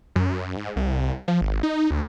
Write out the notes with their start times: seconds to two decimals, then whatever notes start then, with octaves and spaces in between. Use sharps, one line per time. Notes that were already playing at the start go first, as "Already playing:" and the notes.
0.16 F#2
0.57 G#2
0.76 C2
1.28 F3
1.41 G#1
1.63 D#4
1.91 D2